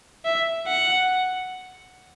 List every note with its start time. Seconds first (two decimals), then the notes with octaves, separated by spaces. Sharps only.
0.25 E5
0.67 F#5